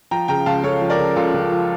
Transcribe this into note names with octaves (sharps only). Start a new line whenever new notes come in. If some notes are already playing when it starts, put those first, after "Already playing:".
F3 G5 A#5
C#3 G5 A#5
C#2 F5 A5
C#2 A4 C#5
F3
A#4 D5
C#3
C#2 F4 A4
C#2
F3